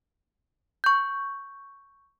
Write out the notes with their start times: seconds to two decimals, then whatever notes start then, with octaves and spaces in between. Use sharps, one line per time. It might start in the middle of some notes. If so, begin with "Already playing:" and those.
0.84 C#6 G6